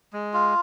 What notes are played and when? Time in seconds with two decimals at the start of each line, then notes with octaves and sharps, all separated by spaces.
0.13 G#3
0.34 F4